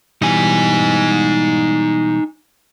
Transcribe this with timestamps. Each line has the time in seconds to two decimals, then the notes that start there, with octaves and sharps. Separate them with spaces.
0.22 B2 E3 G3 D#4 G#5